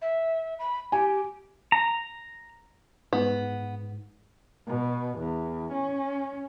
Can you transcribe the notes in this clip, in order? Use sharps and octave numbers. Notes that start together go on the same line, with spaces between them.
E5
B5
G4 G#5
A#5
G#2 B3
B2
E2
C#4